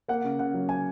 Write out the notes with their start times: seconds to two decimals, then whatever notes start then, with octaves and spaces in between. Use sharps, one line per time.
0.08 A#3 F#5
0.24 C#3
0.39 C#3 F#5
0.54 F#3
0.69 G#5